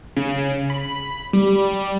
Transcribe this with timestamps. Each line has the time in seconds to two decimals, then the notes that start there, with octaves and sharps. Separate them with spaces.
0.17 C#3
0.70 B5
1.33 G3